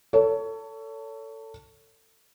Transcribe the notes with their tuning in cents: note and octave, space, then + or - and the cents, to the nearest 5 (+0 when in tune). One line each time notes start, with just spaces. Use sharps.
A4 +20 C#5 +25